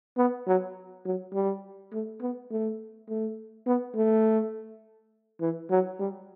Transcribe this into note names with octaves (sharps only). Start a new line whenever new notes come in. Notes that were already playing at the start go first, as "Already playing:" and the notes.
B3
F#3
F#3
G3
A3
B3
A3
A3
B3
A3
E3
F#3
G3